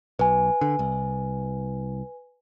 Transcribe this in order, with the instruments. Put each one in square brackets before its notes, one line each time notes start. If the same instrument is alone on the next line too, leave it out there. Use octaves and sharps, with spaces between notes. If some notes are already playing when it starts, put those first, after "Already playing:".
[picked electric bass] B1 [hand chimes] B4 G#5
[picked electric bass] D3
C2